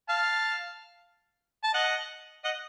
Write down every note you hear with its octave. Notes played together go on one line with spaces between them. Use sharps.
F5 A5
A5
D#5 F#5
D#5 F#5